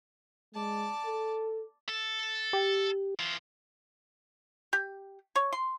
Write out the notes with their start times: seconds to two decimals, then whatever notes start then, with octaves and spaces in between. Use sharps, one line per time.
0.54 G#3 D5 A5
1.05 A4
1.88 A4
2.53 G4
3.19 E3 F4
4.73 G4
5.36 C#5
5.53 C6